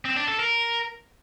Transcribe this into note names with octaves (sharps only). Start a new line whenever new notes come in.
C4
D4
A4
A#4